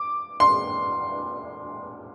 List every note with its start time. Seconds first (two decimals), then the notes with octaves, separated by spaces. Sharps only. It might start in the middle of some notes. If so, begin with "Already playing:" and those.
Already playing: D6
0.40 C6